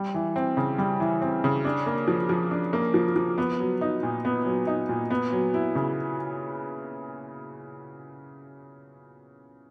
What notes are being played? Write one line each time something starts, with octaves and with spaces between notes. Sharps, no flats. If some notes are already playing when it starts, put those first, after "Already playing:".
Already playing: G3
E3
C4
C#3
G3
E3
C4
C#3
D4
A#3
F3
F3
D4
A#3
F3
F3
B3
F#3
D#4
A#2
B3
F#3
D#4
A#2
B3
F#3
E4
C#3